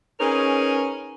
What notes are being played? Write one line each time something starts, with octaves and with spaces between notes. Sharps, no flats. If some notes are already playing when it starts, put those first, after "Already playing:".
C#4 D#4 G#4 A#4 B4 C#5